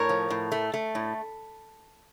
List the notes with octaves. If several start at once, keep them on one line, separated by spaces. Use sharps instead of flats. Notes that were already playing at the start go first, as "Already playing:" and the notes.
Already playing: A2 A#4 C#5
F3
A2
A3
A3
A2